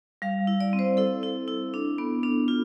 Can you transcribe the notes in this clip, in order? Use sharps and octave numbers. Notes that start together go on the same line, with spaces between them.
G3 F5
E4
D5
C4
C5
E4 A4
E4
E4
D4
B3
D4
F4